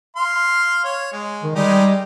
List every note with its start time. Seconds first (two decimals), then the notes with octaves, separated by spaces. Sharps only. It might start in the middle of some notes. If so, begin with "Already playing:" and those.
0.16 F5 C6
0.84 C#5
1.12 G#3
1.43 D#3
1.55 G3 G#3 D#4 G4